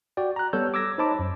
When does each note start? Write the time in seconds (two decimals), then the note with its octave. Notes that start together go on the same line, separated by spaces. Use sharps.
0.17 F#4 D5 G5
0.36 A#5 F#6
0.53 G3 B3 A4 C#5 E6 G6
0.74 D6 E6 G#6 A#6
0.98 D#4 C5 C#5 A5 B5 D6
1.19 F#2